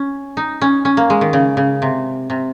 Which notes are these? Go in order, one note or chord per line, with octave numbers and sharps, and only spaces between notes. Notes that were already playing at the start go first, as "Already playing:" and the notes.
Already playing: C#4
D#4
C#4
C#4
A#3
G#3
D#3
C#3
C#3
C3
C3